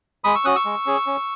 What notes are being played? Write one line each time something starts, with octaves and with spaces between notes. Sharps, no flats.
G#3 B5 D#6
C#6 E6
C#4 F#4 D#6 F#6
C#6 E6
G#3
C#4 G#4
C#4